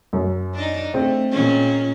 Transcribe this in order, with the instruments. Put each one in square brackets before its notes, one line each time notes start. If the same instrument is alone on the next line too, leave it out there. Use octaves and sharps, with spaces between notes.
[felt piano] F#2
[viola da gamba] D4 D#4
[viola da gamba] A3 [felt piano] C4
[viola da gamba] A#2 G#3 C#4